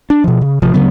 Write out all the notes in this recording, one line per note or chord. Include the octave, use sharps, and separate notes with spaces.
D4
B2 F3
C#3
A1 C3 F3
D2 C#3 F#3 B3